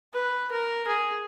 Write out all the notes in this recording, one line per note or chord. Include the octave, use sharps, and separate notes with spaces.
B4
A#4
G#4